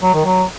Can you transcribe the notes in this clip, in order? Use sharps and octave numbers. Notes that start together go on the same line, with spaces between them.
F#3
D#3
F#3